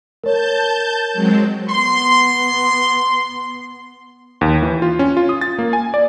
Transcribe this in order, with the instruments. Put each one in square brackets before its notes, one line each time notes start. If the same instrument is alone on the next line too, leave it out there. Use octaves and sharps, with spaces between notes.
[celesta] A#4 C#5 [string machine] A5 G6
[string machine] F#3 G#3 C4
[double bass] B3 [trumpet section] C6
[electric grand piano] D#2
E3
F4
C#4
F4
D#6
A6
A#3
G#5
D5